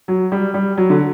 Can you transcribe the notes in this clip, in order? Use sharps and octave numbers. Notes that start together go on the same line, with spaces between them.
F#3
G3
G3
F#3
D3